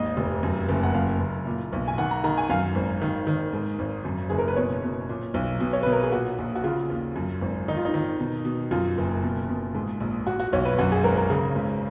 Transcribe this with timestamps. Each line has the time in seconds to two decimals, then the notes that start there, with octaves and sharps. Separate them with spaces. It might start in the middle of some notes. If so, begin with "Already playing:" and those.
Already playing: G#1 D#2 D#5
0.17 F1
0.43 F#2
0.69 F#1
0.83 F#5
0.94 F#2 F5
1.20 F#1
1.47 A#2
1.72 B1
1.88 G#5
1.98 D#3 F#5
2.11 A#5
2.24 D#3 A#5
2.37 G#5
2.50 F#2 F5
2.75 G#1
3.02 D#3
3.27 D#3
3.53 G#2
3.79 G#1
4.05 F#2
4.30 F#1 G#4
4.38 A#4
4.48 B4
4.56 B2 C#5
4.83 B2
5.09 A#2
5.34 B1
5.60 B2
5.73 C#5
5.83 B2 B4
5.92 A#4
6.03 G#4
6.12 A#2 F#4
6.38 A#1
6.55 F#4
6.64 C#3 F4
6.89 D#2
7.16 F#2
7.41 G#1
7.68 D#3 D#4
7.77 F4
7.85 D#4
7.94 D#3
8.20 B2
8.45 B2
8.71 F#2 F4
8.98 F#1
9.24 B2
9.49 B2
9.75 G#2
10.00 A#1
10.27 A#2 F#4
10.39 F#4
10.53 B1 C#5
10.65 B4
10.78 F#2 F#4
10.92 G#4
11.04 G#1 A#4
11.17 A#4
11.30 C#3
11.56 C#2